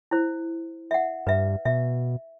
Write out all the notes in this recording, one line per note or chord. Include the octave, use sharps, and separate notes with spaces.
E4 C5
E5 F#5
G2 B4 E5
B2 E5